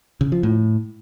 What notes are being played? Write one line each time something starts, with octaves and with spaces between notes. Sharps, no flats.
C#3
F3
A2